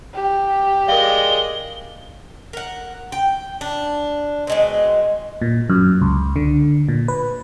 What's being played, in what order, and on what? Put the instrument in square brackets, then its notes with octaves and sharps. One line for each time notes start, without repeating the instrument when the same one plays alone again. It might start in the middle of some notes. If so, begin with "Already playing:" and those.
[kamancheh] G4
[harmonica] G#3 D5 D#5 [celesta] A#4 F5 [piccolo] G7
[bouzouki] A#4 F#5
G5
D4
B2 G#3 C4
[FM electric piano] A#2
F#2
C#2
D3
A#2
B4